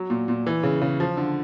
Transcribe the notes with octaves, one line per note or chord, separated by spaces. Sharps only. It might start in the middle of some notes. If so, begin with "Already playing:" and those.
Already playing: F#3
A#2
A#2
E3
C#3
C#3
F3
D3